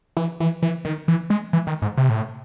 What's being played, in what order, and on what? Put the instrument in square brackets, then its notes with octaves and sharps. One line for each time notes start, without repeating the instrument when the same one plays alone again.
[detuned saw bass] E3
E3
E3
D#3
E3
G#3
E3
D#3
G#2
C3
A2